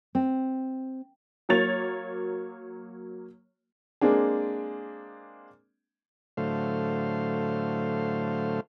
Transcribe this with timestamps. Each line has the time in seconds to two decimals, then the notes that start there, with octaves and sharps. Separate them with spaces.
0.15 C4
1.49 F#3 A#3 C#5 A6 F7
4.01 G#3 A#3 C4 D4 G#4
6.37 A2 D3 F#3 A3 C5 F5